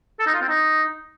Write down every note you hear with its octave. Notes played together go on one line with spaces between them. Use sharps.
A4
D#4
F4
C4
D#4